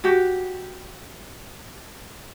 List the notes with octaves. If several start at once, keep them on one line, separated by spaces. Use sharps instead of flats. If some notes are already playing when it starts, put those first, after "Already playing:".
F#4 G4